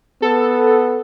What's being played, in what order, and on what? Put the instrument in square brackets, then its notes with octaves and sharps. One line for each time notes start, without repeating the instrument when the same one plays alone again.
[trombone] B3 [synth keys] A4